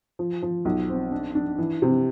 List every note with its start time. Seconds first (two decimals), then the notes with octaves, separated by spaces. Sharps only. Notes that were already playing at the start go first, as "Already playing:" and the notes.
0.19 F3
0.42 F3
0.65 B1
0.88 C4
1.11 D4
1.35 D4
1.58 E3
1.82 C3